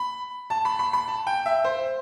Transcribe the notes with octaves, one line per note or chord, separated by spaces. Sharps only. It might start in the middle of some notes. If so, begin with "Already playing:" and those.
Already playing: B5
A5
B5
B5
B5
A5
G5
E5
C5